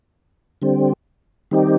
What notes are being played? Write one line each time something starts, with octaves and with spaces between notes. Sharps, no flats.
D3 G3 C4
D#3 G3 C4 D#4 G4